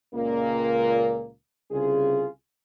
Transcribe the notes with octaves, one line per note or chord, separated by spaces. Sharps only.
C#2 A#2 A#3
C2 C#3 F4 G#4